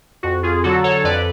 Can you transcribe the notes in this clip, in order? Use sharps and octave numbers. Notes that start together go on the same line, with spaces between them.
F2 F#4
F4 G#4
D3 F#3 F#4 A4
A4 C#5
F2 B4 D5